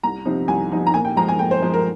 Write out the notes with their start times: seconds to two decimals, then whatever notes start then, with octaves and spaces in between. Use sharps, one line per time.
0.03 C2 A#5
0.25 C3 F3 C4 D#4
0.48 C2 G#5
0.72 C3 F3 C4 D#4
0.87 A#5
0.94 A#2 G#5
1.05 G5
1.16 F3 G#3 A#5
1.28 G#5
1.39 A#2 G5
1.51 C5
1.62 F3 G#3
1.74 A#4